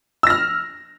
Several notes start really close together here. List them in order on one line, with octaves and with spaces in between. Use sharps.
E6 A#6 F6